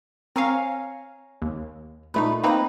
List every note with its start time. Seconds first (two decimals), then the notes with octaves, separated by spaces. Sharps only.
0.36 C4 A#4 C#5 F5 G#5
1.42 D#2
2.14 A#2 A3 D#4 B4
2.43 A#3 C4 D#4 B4 A#5